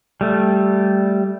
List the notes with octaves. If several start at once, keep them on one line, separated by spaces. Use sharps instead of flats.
G3 A3